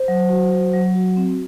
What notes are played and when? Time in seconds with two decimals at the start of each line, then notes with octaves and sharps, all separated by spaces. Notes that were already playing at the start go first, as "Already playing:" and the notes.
Already playing: C5
0.08 F#3
0.29 F#4
0.52 F#3
0.74 F#3
0.95 F#4
1.17 C4